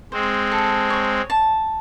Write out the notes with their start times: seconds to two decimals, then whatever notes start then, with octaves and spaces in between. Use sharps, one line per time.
0.12 G#3 C4 C5
0.52 A4
0.90 C#5
1.30 A5